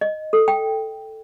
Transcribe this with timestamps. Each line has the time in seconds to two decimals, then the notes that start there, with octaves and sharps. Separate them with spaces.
0.01 D#5
0.33 A4
0.48 G5